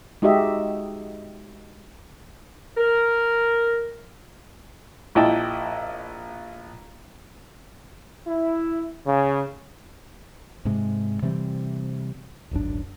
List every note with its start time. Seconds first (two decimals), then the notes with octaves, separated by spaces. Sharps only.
0.22 G#3 D#4 F#4 G4 D#5 E5
2.77 A#4
5.15 A#1 E4 D#5 G5 A5
8.26 E4
9.05 C#3
10.65 G#2 C3 G#3
11.22 C3 E3 G3 C4
12.51 D1 G#1 F#2 D4